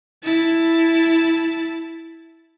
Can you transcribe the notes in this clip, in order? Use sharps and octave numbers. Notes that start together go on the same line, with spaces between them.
E4 A5